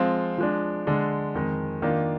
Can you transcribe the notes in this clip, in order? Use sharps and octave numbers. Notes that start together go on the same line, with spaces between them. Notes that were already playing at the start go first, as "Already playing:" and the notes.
Already playing: F3 G#3 C4 F4
F3 G#3 D4
D3 G#3 D4
F2 D#3 G#3
D#3 A#3 D4 F4